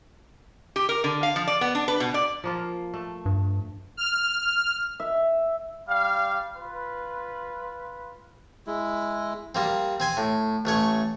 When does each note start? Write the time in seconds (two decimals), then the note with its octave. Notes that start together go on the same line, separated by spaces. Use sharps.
0.76 G4
0.89 A#4
1.04 D3
1.23 F5
1.36 F3
1.47 D5
1.61 B3
1.75 D4
1.88 B4
2.00 B2
2.14 D5
2.44 F3 A#3 F4
2.94 A3
3.26 G2
3.97 F6
5.00 E5
5.89 G3 F5
6.57 F4 B4
8.67 G#3 E4
9.55 G3 A#3 C4
10.00 C4 G#5 C6
10.17 A2
10.65 A1 A3 C#5